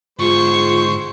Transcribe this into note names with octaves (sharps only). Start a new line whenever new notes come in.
G#2 D3 G#3 F4 C5 C#6